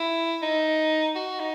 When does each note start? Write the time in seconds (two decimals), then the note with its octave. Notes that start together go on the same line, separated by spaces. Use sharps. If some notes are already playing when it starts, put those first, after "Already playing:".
Already playing: E4
0.42 D#4
1.15 F#4
1.40 D#4